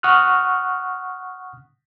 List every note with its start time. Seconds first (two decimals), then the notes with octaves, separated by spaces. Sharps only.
0.03 F#5 C#6 D#6 F6 F#6